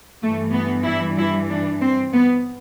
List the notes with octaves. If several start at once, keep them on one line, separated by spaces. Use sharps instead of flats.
G2 E3 G3 A3
B3
E4
E4
D4
C4
B3